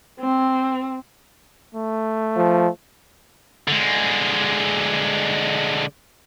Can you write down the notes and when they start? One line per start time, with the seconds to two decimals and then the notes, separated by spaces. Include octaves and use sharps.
0.21 C4
1.75 A3
2.36 F3
3.68 D3 G#3